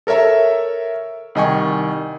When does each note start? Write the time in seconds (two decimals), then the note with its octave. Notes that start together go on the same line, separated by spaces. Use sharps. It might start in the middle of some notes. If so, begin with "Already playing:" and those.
0.07 A4 A#4 C#5 E5 A#5
1.35 C2 D#3 D#5 G5 G#5 C#6